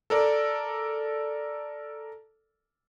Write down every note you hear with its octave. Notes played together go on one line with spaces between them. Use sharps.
A4 A#4 D5